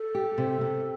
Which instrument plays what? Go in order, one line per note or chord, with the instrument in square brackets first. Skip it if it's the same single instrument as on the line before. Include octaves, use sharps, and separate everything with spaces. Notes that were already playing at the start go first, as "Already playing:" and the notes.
Already playing: [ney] A4
[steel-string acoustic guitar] G4
C3
C3